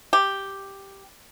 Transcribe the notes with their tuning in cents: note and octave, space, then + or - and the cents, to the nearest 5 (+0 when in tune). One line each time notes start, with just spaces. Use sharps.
G4 +0